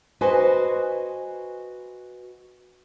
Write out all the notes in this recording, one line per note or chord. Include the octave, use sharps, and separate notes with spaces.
F#4 B4 C5 D#5 G#5